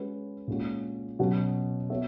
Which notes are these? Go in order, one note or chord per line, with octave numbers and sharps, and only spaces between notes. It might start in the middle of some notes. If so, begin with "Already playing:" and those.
Already playing: G#3 C#4 F#4 B4
A#2 G#3 C#4 F#4
B2 F#3 C#4 F#4
B3 F#4 C#5 E5